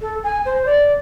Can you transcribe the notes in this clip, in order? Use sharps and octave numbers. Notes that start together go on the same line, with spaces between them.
A4
G#5
C5
D5